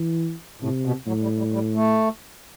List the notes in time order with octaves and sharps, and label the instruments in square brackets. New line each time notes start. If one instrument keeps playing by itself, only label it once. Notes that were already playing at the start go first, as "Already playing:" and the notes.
Already playing: [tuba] E3
[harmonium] A2 [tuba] C3
[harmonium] B2
[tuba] A2 [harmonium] F#3
[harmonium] G3
G3
G3
A3